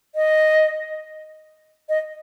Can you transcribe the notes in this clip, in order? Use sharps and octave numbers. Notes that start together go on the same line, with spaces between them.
D#5
D#5